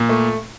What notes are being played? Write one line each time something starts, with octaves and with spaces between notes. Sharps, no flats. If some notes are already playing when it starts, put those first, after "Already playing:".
Already playing: A#2
A3